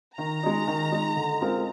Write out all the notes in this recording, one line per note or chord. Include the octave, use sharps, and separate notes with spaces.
D#3 A#5
G#3 D#4
D#3
G#3 D#4
D3
G#3 C4 F4 A#4